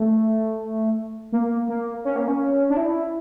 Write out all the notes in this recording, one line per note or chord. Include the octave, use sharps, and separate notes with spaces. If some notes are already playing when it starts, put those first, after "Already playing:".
Already playing: A3
A#3
A#3
C#4
A#3
C#4
D4
E4